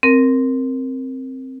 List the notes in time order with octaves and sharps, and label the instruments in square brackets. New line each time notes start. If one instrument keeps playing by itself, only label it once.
[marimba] C4 A#4